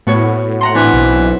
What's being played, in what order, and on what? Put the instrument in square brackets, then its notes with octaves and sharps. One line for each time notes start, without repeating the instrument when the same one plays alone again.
[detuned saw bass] A2 [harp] B3 F#4 C#5
[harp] F#5 A#5 C6
[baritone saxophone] E3 [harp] C4 D4
[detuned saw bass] B1